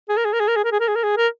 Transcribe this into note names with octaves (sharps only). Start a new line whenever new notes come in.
G#4
A#4
G#4
A#4
G#4
A#4
G#4
A#4
G#4
A#4
G#4
A#4
G#4
A#4